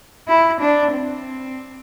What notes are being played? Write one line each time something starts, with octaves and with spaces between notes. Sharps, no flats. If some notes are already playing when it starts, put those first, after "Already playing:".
E4
D4
C4